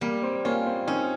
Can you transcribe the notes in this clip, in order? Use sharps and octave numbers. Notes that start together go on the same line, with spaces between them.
G3 A#3
C4
A#3 C#4 F4
C4
C4 C#4 D#4